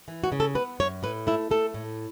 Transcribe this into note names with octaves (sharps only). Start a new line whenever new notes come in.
E3
F#4
C#3
A4
B3 B4
F#2 C#5
A2 B4
A3 E4
A3 A4
A2